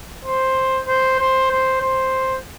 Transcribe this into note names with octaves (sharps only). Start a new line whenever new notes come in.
C5
C5
C5
C5
C5